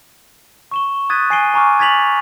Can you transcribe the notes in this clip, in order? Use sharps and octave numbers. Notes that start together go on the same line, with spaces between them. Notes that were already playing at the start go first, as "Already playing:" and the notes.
C#6 E7 G7
D#6 F#6 G#6 A6 B6 D#7
G#5 A#6 C7 D7 D#7 G7
G#5 A#5 C#6 D6 F6
G#6 A6 B6 F7 F#7